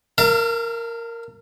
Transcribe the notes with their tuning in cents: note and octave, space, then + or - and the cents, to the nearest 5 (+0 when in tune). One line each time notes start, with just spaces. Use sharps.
A#4 -5 F5 -40 A5 +40